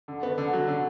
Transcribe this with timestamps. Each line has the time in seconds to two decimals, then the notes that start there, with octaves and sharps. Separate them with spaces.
0.08 D3
0.23 B3
0.38 D3
0.53 F#3
0.68 D3